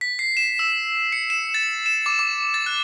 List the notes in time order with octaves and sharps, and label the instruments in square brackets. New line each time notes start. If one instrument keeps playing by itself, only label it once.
[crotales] B6
C7
E7
E6
C#7
E7
A6
E7
D6
D6
A6
F#6